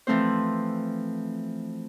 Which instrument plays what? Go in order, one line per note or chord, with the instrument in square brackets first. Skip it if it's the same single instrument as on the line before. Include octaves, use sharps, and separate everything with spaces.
[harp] E3 F3 A3 C4 C5